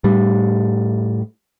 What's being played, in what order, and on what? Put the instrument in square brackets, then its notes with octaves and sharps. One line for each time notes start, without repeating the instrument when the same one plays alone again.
[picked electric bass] A2 G3